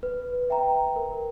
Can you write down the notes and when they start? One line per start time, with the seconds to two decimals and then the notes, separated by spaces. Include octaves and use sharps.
0.03 B4
0.50 E5 G5 A#5
0.96 A#4